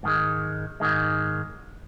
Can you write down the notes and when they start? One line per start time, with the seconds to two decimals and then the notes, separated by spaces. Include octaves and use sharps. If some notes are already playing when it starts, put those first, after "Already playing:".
0.03 G#2 D#3 G#3
0.80 G#2 D#3 G#3